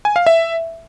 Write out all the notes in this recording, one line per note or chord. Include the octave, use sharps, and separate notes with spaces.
G#5
F5
E5